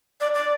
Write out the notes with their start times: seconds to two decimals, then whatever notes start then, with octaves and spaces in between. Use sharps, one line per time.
0.21 D5
0.34 D5